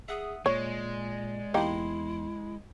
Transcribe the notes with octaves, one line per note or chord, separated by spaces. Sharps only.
G#4 E5 F#5 D#6
A#2 G#3 C#5 D5
E2 A#3 D#4 E4 G4 C6